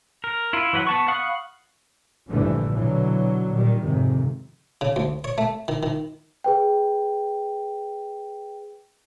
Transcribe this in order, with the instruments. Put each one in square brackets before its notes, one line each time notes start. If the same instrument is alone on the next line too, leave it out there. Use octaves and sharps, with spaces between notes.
[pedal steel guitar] A#4
E4 F4
E3 F#3 B4 F#5
B3 A5 C#6
F5 F#5 B5 C#6 D#6
[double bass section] A#1 G2 D3 E3 F3 A3
B2 D3 E3 F#3
A#2 D#3 G3
G#1 F2 G#2 C3 D#3
[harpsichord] C#3
D2
C#5
A3
D#3
D#3
[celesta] G#4 B4 G5